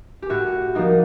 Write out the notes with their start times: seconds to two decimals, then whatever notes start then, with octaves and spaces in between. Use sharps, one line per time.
0.22 G4
0.30 A2 F#4
0.75 F3 A#3 D#4